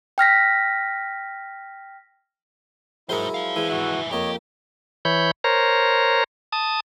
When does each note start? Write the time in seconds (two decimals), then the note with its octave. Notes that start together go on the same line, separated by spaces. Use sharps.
0.18 G5 F6 A#6 B6
3.09 F#3 G#3 E4 G#4 A#4 C5
3.34 C5 F5
3.56 E3 G#3
3.70 G#2 E4 F#4
4.11 F2 A#3 G4 C#5 D#5
5.05 E3 C#5 B5 G6
5.44 A#4 C5 C#5 A#5
6.52 A5 D#6